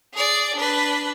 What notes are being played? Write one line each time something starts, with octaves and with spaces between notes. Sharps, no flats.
G#4 D5
D4 B4